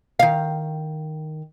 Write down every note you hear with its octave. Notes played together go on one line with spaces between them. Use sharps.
D#3 F5